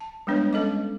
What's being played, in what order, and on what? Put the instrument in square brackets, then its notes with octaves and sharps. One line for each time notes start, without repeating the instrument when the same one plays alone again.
[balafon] A5
G3 G#3 B3 D4 B4 C#5
G#3 C#4 A4 D#5 D6